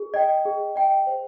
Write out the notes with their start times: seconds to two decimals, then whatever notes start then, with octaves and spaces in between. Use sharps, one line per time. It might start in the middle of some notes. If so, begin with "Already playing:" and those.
Already playing: G#4
0.14 D#5 G5
0.45 G#4
0.76 D#5 G5
1.07 C5